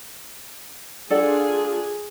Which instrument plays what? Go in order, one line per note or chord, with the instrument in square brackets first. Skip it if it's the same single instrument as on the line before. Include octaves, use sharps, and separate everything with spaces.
[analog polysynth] D4 F4 [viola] G#4 [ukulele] A4 D5 F#5